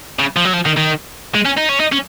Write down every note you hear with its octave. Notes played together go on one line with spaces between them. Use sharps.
C#3
F3
F#3
F3
D#3
D#3
G#3
C#4
D#4
C#4
D#4
C#4